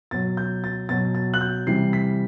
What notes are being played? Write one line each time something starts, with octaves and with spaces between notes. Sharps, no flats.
B2 F#3 A6
G6
A6
B2 F#3 A6
A6
F#6
G6
C3 E3 G3 C7
B6